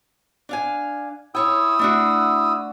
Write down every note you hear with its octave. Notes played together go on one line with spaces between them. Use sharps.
D4 F5 G#5
E4 C#5 G5 D#6 E6
A3 D4 F#4